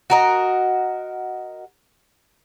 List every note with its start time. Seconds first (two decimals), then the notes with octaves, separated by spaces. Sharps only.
0.10 F#4 A#4 D#5